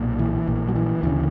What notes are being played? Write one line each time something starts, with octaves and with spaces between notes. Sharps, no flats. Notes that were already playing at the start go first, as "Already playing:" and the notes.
Already playing: B1 A#2
E3
A#1 A#2
F#3
E3
D2 C#3 E3